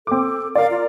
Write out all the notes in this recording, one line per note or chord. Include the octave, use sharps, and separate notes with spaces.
C4 A4 D6
A#4 D5 F5
F4